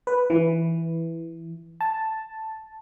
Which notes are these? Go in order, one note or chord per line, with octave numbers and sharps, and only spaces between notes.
B4
E3
A5